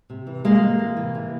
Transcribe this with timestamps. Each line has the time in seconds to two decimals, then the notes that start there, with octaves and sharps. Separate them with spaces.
0.10 C3
0.27 E3
0.44 C3 G#3 A#3
0.62 E3
0.79 C3
0.97 E3
1.15 C3